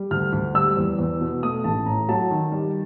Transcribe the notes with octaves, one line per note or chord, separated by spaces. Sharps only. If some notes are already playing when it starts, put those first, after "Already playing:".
Already playing: G3
D2 F6
D2
G3 E6
E2
E2
B2
A3 D#6
A1 A5
A2 A#5
F#3 A5
D#3
G3